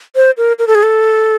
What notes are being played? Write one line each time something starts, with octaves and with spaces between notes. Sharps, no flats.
C5
A#4
A#4
A4
G#4
A4